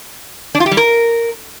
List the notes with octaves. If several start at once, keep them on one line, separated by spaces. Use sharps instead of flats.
D4
F4
G4
G3
A#4